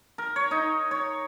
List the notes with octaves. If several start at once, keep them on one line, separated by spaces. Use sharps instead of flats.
A#4
C#5
D#4
C#5